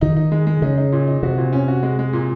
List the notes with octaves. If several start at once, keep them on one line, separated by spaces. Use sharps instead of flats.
D#3 D#4
D#4
G#3
G#3
C#3 D#4
D#4
A#2
D#4
C3 F#4
A#2
C#4
F#4
G#3
G#3
A#2